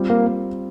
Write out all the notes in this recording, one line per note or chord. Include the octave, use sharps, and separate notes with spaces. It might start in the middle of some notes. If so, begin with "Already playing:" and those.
Already playing: G3 C4 F4
A#3